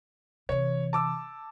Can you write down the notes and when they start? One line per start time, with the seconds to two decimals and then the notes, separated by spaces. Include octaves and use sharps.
0.49 C3 E3 C#5
0.93 A5 D6 E6